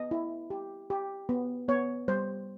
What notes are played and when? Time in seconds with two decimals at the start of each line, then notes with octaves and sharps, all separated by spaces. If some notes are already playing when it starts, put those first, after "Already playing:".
Already playing: B3 D#5
0.11 E4
0.50 G4
0.90 G4
1.29 B3
1.68 B3 C#5
2.08 G3 C5